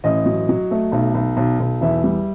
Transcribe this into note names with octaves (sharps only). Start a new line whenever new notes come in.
A1 D#5
F#3
F#3
A3
B1
B1
B1
B1
E2 E5
G3